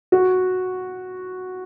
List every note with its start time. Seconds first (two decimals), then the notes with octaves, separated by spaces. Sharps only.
0.12 F#4